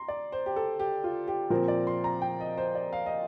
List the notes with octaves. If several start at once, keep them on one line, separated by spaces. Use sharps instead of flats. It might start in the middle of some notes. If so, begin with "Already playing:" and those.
Already playing: A#5 C6
D5
C5
G4
A4
G4
F4
G4
A#2 F3 C4 A#4
D5
C6
A#5
G5
D#5
C5
D5
F5
D#5